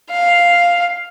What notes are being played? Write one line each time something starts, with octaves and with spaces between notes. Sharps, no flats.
F5